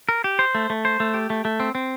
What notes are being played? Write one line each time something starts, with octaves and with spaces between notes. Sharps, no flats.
A#4
G4
C5
A3
A3
C5
A3
G4
A3
A3
C4
C4